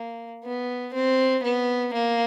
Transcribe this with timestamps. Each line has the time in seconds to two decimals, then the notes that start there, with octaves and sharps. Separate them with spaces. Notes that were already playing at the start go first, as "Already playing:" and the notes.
Already playing: A#3
0.44 B3
0.94 C4
1.43 B3
1.93 A#3